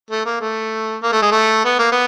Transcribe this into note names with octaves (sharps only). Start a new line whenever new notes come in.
A3
A#3
A3
A#3
A3
G#3
A3
B3
A#3
B3